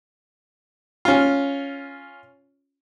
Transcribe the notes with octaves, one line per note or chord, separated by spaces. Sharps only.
C#4 F4